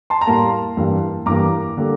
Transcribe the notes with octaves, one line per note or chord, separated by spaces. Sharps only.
A5 C6
A#5
A2 G3 A#3 A5 C6
G2 E3 G3 A#3
G2 E3 G3 A#3 A#5 D6
D3 G3 A#3